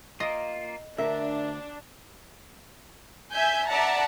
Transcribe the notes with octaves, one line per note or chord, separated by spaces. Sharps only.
A#3 F4 D#5
D2 D4 A#4 E5
E5 G#5 G6
D5 E5 F#5 A5 A#5